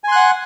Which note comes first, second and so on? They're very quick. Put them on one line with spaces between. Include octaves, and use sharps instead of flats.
G#5 C6 F#6 F#5